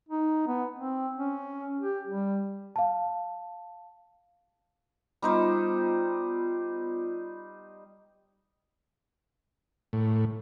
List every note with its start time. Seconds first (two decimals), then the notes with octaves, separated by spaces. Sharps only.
0.09 D#4
0.48 B3
0.76 C4
1.18 C#4
1.80 G4
2.07 G3
2.76 F5 A5
5.22 G3 B3 D#4 F4 C5
9.93 A2